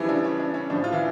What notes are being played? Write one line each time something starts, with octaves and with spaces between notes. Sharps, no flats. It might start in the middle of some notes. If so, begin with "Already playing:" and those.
Already playing: C#3 E3 F3 G3 E4
D4
C#4
D4
C#4
A2 F3 D4
F4
E3 E4